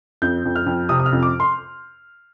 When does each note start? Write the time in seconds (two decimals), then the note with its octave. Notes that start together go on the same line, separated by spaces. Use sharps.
0.22 F2 G6
0.45 F2
0.56 F6
0.66 F2
0.89 C3 D#6
1.00 D#6
1.06 F6
1.12 F2
1.23 D6
1.40 C6